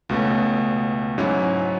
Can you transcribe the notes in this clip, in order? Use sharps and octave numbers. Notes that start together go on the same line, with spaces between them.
C#2 B2 A3 C#4
G#2 F#3 C#4 E4